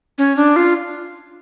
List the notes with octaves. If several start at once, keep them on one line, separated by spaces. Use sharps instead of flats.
C#4
D4
F4